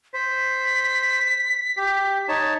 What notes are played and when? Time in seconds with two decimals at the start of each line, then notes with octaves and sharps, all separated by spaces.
0.14 C5 B6
1.77 G4
2.28 D#4 C#5 A5